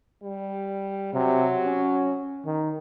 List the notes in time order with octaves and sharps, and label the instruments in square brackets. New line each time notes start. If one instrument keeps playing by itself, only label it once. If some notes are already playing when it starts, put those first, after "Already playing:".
[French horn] G3
[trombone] C3 [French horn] F#3
[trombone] C#4
D#3